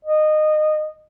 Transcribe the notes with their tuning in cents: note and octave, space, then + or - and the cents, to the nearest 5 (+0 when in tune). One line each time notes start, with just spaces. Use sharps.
D#5 -20